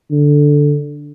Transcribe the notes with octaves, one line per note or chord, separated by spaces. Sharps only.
D3